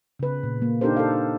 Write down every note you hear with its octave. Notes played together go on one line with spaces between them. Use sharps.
C#3 B4
A#2
A#3
D4 D#4 G4 A4 A#4 C5
A4 F5